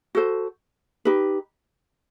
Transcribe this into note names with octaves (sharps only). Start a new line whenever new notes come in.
F#4 A4 C5
D#4 G4 B4